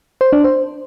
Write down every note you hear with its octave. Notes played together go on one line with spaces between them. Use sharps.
C5
D4
C5